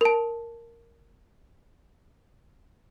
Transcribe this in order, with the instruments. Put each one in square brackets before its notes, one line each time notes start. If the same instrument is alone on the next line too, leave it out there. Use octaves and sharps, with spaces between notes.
[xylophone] A#4 A5